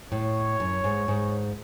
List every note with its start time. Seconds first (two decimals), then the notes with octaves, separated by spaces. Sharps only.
0.12 A2 C#5
0.60 F#2
0.84 G#2
1.08 G#2